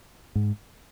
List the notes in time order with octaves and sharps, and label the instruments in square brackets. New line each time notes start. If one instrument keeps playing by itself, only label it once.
[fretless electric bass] G#2